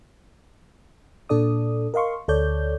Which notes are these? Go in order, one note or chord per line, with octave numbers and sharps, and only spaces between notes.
A#2 D4 A4 D5 D#6
A#4 D#5 F5 C6 C#6
D2 A4 C#5 D5 G6